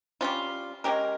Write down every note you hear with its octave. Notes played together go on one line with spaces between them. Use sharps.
G3 C#4 F4
G#3 C#4 G4 A#4